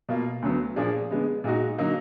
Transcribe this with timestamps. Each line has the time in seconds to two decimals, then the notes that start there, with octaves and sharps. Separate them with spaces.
0.09 B2 A#3 F4
0.42 D2 D3 F#3 B3
0.76 A#2 F3 A#3 D4 G#4
1.11 D3 G#3 B3
1.44 A#2 G#3 D#4 F#4
1.78 D3 F#3 A#3 D#4